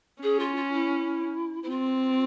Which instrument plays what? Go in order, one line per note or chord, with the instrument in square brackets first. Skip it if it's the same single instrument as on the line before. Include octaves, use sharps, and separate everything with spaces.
[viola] C#4 [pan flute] G#4
[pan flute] F4
F4
E4
E4
[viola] C4 [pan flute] F4